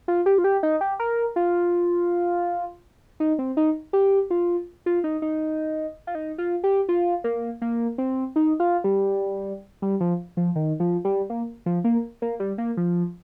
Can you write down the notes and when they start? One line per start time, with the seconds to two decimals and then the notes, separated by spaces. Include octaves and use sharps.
0.08 F4
0.26 G4
0.38 F4
0.44 G4
0.63 D#4
0.81 G4
1.00 A#4
1.36 F4
3.20 D#4
3.39 C4
3.57 D#4
3.93 G4
4.30 F4
4.86 F4
5.04 D#4
5.22 D#4
6.07 F4
6.15 D#4
6.38 F4
6.64 G4
6.89 F4
7.24 A#3
7.62 A#3
7.98 C4
8.36 D#4
8.60 F4
8.84 G3
9.82 G3
10.00 F3
10.37 F3
10.56 D#3
10.80 F3
11.05 G3
11.30 A#3
11.66 F3
11.84 A#3
12.22 A#3
12.40 G3
12.58 A#3
12.77 F3